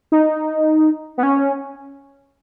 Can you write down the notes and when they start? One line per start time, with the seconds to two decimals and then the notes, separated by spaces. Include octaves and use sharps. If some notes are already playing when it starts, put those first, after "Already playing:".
0.12 D#4
1.18 B3
1.23 C#4